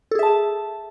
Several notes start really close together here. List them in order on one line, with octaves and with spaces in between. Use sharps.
A4 G#4 E5 A5